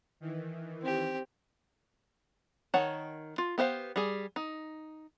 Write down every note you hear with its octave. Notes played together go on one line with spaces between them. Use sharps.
D#3 E3
C4 G4
D#3 C#5 F#5 A5
F4
B3 G4 C5 F5
G3 G#4
D#4